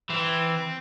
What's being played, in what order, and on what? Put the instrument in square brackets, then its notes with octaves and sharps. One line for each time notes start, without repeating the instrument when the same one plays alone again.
[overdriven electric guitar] E3 [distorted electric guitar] C4